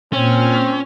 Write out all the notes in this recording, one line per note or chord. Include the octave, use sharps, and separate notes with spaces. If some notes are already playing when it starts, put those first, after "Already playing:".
A#2 C4 C#4 F6